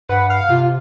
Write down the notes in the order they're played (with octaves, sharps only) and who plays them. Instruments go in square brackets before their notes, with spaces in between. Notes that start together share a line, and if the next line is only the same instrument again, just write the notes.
[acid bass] G2 [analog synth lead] B4 [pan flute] F#5
[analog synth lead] F5
[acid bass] C3 [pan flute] F4